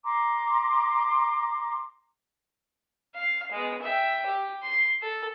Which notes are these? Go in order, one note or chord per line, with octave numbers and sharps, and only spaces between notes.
A#5 C6 D6
F5
G#3 B3
E5 G5
G4
C6
A4